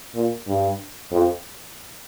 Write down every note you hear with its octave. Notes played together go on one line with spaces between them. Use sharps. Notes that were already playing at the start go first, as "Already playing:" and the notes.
A#2
G2
F2